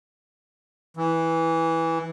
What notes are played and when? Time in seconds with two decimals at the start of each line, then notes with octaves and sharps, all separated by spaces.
0.97 E3